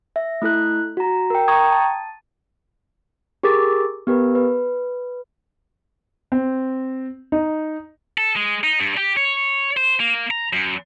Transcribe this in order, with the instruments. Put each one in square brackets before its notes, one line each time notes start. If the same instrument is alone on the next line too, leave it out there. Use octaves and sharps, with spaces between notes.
[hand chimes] E5
A3 E4 A4 F#6
F#4 A#5
A#4 G5
G5 A#5 C#6 D#6 G#6
A5
G4 G#4 A#4 D6 A6
B3 G4 A#4 B4
B4
[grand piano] C4
D#4
[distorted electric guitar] A4
G#3
D#4
G2
G4
C#5
C5
A#3
A#5
F#2